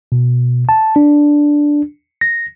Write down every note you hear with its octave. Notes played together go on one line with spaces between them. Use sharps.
B2
A5
D4
A#6